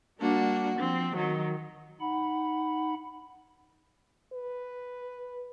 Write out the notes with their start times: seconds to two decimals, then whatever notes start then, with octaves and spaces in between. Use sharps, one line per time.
0.19 G3 A#3 D4 F#4
0.78 F3 C4
1.14 D#3 F#3
2.01 D#4 F#5 B5
4.33 B4